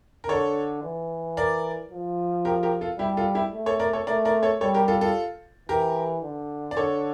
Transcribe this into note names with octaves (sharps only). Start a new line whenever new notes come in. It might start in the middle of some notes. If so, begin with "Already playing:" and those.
A#4
D3 A4 C#5
E3
A#4 D5
F3
G4 A#4
G4 A#4
F4 A4
G3 E4 G4
F4 A4
E4 G4
A3
A4 C#5
A#4 D5
A4 C#5
A3 A#4 D5
A#4 D5
A4 C#5
G3 A4 C#5
G4 A#4
F4 A4
F4 A4
E3 G4 A#4
D3
D5
D3 A4 C#5